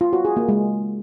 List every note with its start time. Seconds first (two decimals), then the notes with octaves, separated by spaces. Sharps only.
0.01 F4
0.13 F#4
0.25 G#4
0.37 A#3
0.48 G#3